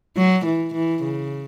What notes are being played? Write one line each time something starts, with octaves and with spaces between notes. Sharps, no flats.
F#3
E3
E3
C#3